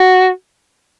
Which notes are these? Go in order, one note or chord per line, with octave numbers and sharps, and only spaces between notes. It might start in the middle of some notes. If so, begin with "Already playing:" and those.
Already playing: F#4